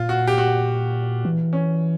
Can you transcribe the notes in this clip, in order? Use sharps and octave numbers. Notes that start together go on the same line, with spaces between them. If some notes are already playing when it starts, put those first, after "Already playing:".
Already playing: A#2 F4
F#4
G4
F#4
E3
C#4